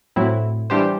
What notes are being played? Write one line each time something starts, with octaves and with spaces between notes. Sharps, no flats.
A2 F#3 C4 E4
E3 G3 D4 G4 C5